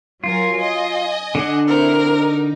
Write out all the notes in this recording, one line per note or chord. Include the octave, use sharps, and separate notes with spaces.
F#3 F4 A#4 G#5
D#5 G#5
D3 D4 F#5
C4 E4 A#4 C5
D#4